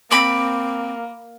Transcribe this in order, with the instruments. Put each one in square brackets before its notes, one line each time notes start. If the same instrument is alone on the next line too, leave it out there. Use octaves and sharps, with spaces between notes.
[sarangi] A#3 [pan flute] C4 [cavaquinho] B5 D6